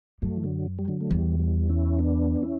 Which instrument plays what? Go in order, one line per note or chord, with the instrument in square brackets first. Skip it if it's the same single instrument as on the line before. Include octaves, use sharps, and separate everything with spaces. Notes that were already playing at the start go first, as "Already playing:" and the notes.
[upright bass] F#2 [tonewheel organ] F#3 A3
[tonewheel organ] E3
D3 F#3
G3
D3 F#3
A3
[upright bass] E2 [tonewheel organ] E3 G3
[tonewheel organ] E3 G3
C#4 E4
B3 D4
C#4 E4